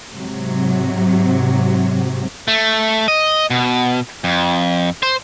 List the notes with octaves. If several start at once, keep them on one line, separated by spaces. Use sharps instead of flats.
G#2 C3 F#3
A3
D#5
B2
F2
C5